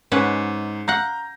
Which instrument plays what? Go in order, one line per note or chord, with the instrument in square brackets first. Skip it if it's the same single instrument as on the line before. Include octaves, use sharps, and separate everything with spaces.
[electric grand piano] G#2 [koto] C#4 B4 F#5
[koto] F5 F#5 [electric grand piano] A#5 G6 A#6